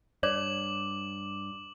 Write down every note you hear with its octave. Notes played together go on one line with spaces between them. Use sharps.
G2 C#5 D5 D6 F#7